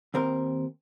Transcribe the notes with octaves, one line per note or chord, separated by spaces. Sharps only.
D#2 C4 A#4